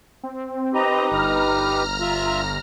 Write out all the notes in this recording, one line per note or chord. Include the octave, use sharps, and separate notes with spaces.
C4
D#4 G4 B4 D#5 A#5
G1 A#5 F6
F4 E5